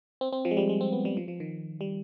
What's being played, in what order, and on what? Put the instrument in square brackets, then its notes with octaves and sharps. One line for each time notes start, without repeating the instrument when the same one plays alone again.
[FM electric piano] C4
C4
F3
G#3
G3
G#3
C4
B3
G3
F3
F3
D#3
G3